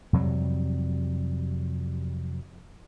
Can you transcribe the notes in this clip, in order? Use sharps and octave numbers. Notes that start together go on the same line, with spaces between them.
F2 C3 F#3 G3